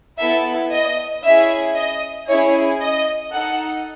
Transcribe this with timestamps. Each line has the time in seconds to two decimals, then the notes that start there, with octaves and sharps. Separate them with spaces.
0.19 B3 E4 A4 E5
0.72 D#5
1.23 C#4 E4 G#4 E5
1.76 D#5
2.28 C#4 E4 G#4 C#5
2.80 D#5
3.32 D#4 A4 F#5